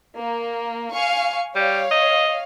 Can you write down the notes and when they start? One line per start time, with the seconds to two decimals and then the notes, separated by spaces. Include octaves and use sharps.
0.18 A#3
0.93 F5 G#5 C#6
1.56 G3 C#5 F5
1.91 D#5